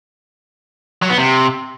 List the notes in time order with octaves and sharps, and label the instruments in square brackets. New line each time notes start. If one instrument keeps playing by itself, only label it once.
[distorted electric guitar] F#3
B3
C3